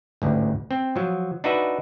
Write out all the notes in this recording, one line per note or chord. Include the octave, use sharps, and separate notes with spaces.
A1 D2 G#2
C4
F3 F#3
D4 D#4 F#4 B4 E5